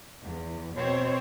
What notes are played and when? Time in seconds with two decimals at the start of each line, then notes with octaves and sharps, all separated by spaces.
0.24 E2
0.74 B2 C4 C5 C#5